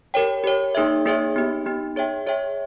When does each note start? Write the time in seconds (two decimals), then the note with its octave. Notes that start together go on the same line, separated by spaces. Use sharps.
0.14 G4 A#4 C#5 G5
0.44 G4 A#4 C#5 G5
0.75 A#3 D#4 G#4 C#5 E5
1.05 A#3 D#4 G#4 C#5 E5
1.36 B3 D#4 G4
1.66 B3 D#4 G4
1.96 G#4 C#5 E5 G5
2.26 G#4 C#5 E5 G5